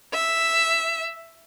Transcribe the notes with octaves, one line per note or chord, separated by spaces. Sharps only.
E5